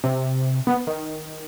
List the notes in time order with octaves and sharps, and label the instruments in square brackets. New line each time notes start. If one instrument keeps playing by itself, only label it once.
[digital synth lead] C3
B3
D#3